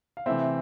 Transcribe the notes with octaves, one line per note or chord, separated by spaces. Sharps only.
F5
C3 E3 A3 C4 E4 E5